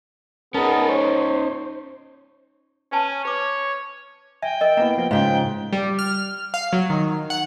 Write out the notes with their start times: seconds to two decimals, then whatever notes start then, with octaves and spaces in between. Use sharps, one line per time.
0.54 B3 C#4 D#4 G#4 A#4 A5
0.89 C5 C#5
2.92 C#4 B4 G#5 A5
3.25 B4 C#5 D6
4.42 E5 G5 G#5
4.61 A#4 D#5
4.77 A#3 B3 E4 A#5
4.98 F3 A#3 B3
5.11 G#2 C#3 F4 G5
5.73 G3
5.99 F6
6.54 F5
6.73 F#3
6.90 D#3
7.30 F#5